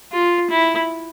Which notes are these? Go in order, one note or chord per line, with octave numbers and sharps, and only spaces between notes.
F4
E4